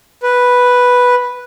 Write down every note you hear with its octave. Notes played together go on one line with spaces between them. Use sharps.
B4